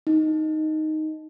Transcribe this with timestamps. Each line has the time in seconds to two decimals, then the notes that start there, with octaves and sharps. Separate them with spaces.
0.07 D#4